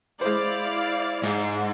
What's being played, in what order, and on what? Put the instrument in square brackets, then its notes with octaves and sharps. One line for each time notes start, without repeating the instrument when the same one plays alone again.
[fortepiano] G#3 C5 [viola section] E4 D5 F5
[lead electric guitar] G#2